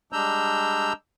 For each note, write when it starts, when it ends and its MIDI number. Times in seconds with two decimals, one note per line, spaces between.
0.13 0.93 55
0.13 0.93 56
0.13 0.93 62
0.13 0.93 82
0.13 0.93 88
0.13 0.93 91